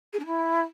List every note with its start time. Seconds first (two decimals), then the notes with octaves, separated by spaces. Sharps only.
0.12 G#4
0.19 D4
0.25 E4